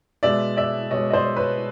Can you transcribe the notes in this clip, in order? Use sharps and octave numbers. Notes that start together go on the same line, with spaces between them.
B2 G#3 D5 E5
D5 E5
B2 G#3 C#5 D#5
D#5
C5 D5
B4 C#5